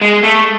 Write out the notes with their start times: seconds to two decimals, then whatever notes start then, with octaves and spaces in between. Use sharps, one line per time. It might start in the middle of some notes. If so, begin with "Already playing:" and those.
0.01 G#3
0.23 A3